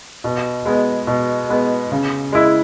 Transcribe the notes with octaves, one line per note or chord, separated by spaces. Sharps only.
B2
G#3 B3
B2
G#3 B3
C#3
G#3 E4